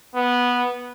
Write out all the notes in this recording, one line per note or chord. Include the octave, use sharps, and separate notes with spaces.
B3